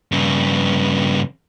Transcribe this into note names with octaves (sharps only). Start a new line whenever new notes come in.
G2 C#3